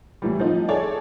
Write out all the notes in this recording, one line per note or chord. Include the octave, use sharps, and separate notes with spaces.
A2 E3 G3
F3 C4 D#4
G#4 A4 C#5 D5